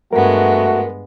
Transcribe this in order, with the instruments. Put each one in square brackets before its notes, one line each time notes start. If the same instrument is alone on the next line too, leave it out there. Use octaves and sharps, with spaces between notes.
[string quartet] G2 G#3 B3 [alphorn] A3 [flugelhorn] F#4 [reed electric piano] A#4